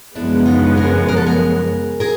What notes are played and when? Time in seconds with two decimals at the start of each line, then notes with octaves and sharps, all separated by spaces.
0.15 F#2 C#3 F3 G#3 B3 D4 E4
0.46 D#4 F4
0.77 G#4 A#4
1.09 A#4
1.17 A4
1.26 G#4 A#4
2.00 G#4 A#4